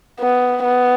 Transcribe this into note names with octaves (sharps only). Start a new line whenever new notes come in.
B3
B3